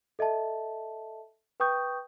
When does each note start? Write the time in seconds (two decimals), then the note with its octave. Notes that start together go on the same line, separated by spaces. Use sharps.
0.19 A4 D#5 E5 A5
1.60 B4 G5 C#6 D#6 G6